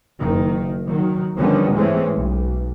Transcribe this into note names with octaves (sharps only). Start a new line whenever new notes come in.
F#1 D#3
D#3 F#3
D3 D#3 F3 G3 B3 C#4
G#2 E3 G#3 A3 C4 C#4
B1